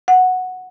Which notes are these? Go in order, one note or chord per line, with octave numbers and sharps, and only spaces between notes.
F#5